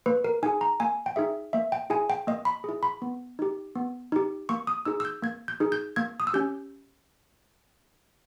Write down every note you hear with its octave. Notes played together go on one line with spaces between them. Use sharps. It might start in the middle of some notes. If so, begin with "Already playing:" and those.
A#3 B4
A#4
D#4 G#4 G#5
A#5
A#3 G#5
G5
D#4 G#4 E5
A#3 E5
G5
E4 G#4 G#5
G5
A#3 D#5
B5
E4 G#4
B5
B3
D#4 G4
B3
D#4 G4
A#3 C#6
D#6
D#4 G#4 E6
E6
G6
A#3 G#6
G6
D#4 G#4
G6
A#3 G#6
D#6
E6
C#4 G4 G6